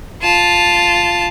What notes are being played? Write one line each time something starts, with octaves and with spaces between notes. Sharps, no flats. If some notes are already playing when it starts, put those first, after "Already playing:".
F4 A5